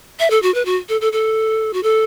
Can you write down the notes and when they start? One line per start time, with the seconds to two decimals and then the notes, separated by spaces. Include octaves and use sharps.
0.19 E5
0.30 A4
0.42 F#4
0.54 B4
0.65 F#4
0.89 A4
1.01 A4
1.13 A4
1.73 F#4
1.83 A4